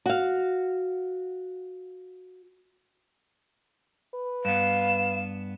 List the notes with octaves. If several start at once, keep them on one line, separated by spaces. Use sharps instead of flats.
F#4 F5
B4
G2 B3 F5 E7